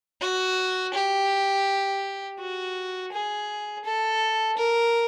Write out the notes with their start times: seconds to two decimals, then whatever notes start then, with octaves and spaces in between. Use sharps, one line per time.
0.21 F#4
0.93 G4
2.40 F#4
3.12 G#4
3.85 A4
4.57 A#4